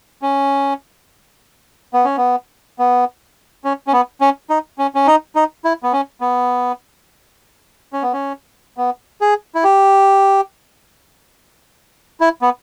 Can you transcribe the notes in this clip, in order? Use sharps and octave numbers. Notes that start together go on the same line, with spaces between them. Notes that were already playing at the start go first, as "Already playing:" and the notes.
C#4
B3
C#4
B3
B3
C#4
C#4
B3
C#4
D#4
C#4
C#4
D#4
D#4
E4
B3
C#4
B3
C#4
B3
C#4
B3
G#4
E4
G4
E4
B3